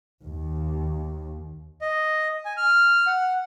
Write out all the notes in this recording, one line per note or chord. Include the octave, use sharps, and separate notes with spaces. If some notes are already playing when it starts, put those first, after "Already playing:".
D#2
D#5
G#5
F6
F#5